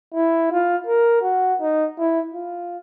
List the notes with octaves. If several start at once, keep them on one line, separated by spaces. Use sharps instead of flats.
E4
F4
A#4
F#4
D#4
E4
F4